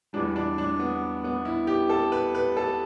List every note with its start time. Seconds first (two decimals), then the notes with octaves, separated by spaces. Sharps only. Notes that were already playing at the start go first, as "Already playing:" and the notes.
0.13 E2 E3 G3 D4
0.36 D4
0.58 D4
0.79 B3
1.24 B3
1.45 E4
1.67 G4
1.89 A4
2.12 B4
2.35 B4
2.57 A4